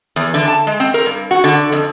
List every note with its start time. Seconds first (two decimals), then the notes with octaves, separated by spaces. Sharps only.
0.16 E2
0.34 D3
0.48 A5
0.67 G#3
0.80 C4
0.94 A#4
1.06 G2
1.31 F#4
1.44 D3
1.72 F2